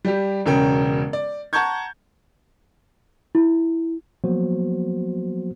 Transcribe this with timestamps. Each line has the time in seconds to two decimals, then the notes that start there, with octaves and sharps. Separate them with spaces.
0.05 G3 G4
0.46 E1 C#3 C#4 A#4 G5
1.13 D5
1.53 F#5 A5 A#5 C#6 G6 G#6
3.35 E4
4.24 F3 F#3 A#3 B3 F#4 C5